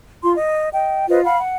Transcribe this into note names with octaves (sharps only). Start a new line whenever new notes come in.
F4 C6
D#5
D#5 G5
F4 B4 C5 D#5
F5 F#5 B5
F#5